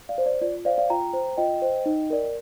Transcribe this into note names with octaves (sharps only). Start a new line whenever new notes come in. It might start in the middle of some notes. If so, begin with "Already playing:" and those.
D5 F5
C5
D5
F4 D5
C5 D5 F5
D5 F5
F4 G5 A#5
C5
F4 D#5 G5
C5
D#4
A#4 D5